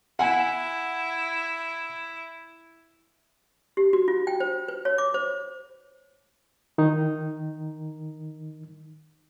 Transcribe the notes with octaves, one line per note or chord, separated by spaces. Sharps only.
E4 F#5 G#5
G4
F#4
F4
G5
C5
B4
C#5
D6
C5
D#3 D#4